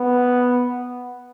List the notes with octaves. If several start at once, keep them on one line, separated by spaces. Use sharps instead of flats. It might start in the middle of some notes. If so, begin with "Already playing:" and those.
Already playing: B3